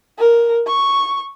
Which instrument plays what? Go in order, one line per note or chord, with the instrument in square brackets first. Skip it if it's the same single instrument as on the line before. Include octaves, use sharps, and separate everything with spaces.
[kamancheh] A#4
C#6